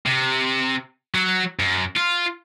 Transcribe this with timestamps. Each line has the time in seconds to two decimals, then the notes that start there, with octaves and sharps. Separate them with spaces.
0.06 C3
1.15 F#3
1.59 F#2
1.97 F4